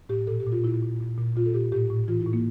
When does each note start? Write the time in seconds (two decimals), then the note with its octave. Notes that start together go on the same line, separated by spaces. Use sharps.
0.09 A2 G4
0.27 A#2 A4
0.40 G4
0.46 A#2
0.52 F4
0.64 A#2 E4
0.83 A#2
1.00 A#2
1.18 A#2
1.36 A#2 F4
1.46 A4
1.54 A#2 G4
1.72 A2 G4
1.90 A2
2.08 E3 F4
2.20 E4
2.26 A2
2.33 A#3